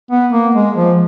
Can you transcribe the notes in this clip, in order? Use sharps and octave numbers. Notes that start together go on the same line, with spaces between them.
B3
A#3
G#3
F3